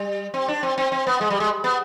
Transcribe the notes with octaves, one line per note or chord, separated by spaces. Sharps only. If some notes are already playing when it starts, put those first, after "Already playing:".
Already playing: G3
C4
D4
C4
C4
C4
B3
G#3
G3
G#3
B3